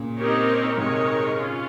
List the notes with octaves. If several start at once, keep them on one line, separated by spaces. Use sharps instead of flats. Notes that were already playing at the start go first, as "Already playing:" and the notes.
Already playing: A#2 C#3
C4 D#4 G4 A#4 C#5
G#2 C3 D#3 G#3 D#4 A#4 C#5
C#4 F4